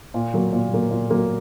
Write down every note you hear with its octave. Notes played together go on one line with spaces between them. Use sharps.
A#2
F#3 A#3
A#2
F#3 A#3
A#2
F#3 A#3